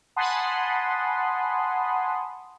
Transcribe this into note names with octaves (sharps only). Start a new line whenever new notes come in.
F#5 G#5 A5 B5 C6 D#6